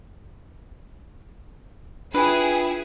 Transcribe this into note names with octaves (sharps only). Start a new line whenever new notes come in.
D4 E4 F4 G#4 B4 G5